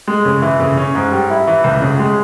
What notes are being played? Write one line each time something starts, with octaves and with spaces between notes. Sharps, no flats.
G#3
C#3
E3
C#3
C#4
G#2
G3
E4
E3
C#2
C#3
G#3